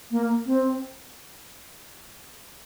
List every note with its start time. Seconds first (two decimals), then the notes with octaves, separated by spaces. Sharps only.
0.11 A#3
0.46 C4